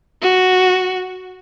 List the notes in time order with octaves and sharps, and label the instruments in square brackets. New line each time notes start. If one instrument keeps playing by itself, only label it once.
[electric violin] F#4